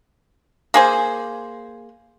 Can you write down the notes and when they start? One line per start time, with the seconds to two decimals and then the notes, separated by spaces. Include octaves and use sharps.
0.74 A#3 G#4 C5